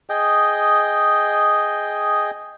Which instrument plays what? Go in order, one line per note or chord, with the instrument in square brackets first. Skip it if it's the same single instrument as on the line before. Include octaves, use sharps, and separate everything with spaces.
[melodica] G#4 D#5 G5